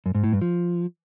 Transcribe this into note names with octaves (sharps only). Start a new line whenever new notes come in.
F#2
G#2
A2
G2
F3